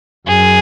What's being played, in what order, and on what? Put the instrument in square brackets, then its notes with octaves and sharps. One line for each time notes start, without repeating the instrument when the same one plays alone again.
[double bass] F#2 [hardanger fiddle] G#4